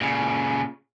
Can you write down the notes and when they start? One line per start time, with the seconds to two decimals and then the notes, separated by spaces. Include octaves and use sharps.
0.01 A#2 C#3